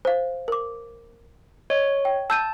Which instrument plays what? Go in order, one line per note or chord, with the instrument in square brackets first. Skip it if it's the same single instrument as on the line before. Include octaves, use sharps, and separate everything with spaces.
[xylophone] C5 F5
A#4 D6
[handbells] C#5 [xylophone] D#5
[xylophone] G5
[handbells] A5 [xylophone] E6 G6 D#7